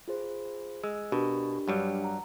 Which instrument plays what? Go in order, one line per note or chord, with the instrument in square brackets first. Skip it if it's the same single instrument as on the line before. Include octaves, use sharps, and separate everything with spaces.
[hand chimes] F4 G#4 C5
[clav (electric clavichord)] G#3 [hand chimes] E6
[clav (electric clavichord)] B2 [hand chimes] D4 G4 A#4
[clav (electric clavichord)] G2 F#3 G3
[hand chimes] F#5 A#5